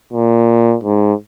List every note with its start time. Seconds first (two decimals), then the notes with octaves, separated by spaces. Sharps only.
0.13 A#2
0.83 G#2